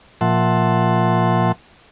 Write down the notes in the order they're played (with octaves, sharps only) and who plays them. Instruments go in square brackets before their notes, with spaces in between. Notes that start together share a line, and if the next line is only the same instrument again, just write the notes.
[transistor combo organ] A#2 F3 E5 F#5 A5 C6